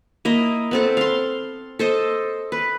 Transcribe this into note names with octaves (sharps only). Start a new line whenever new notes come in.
A#3 E4 D#5
B3 C4 A4
F5 C6
A4 C5 D#5
B4